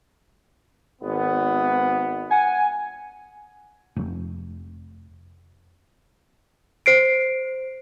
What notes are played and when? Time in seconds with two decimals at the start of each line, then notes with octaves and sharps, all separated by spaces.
1.02 G#1 B3
2.31 F#5 G#5
3.96 F1
6.86 C5 C7 D7